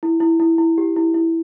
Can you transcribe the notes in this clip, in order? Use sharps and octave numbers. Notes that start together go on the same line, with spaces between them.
E4
E4
E4
E4
G4
E4
E4